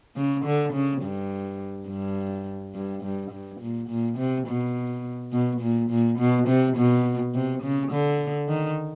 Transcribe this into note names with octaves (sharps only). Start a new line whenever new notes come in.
C#3
D3
C#3
G2
G2
G2
G2
G2
A#2
A#2
C3
B2
B2
A#2
A#2
B2
C3
B2
C3
C#3
D3
D#3